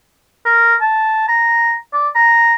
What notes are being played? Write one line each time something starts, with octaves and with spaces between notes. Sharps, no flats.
A#4
A5
A#5
D5
A#5